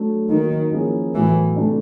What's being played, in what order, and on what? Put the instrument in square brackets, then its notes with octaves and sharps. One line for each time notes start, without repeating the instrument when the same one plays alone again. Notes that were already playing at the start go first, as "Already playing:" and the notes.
Already playing: [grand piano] F#3 A3 D4
[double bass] D#3 [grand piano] F#3 A#3 D#4
[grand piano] F3 A#3 C#4 E4 G#4
[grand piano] A2 F#3 B3 [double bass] E3
[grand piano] C3 E3 A3 D4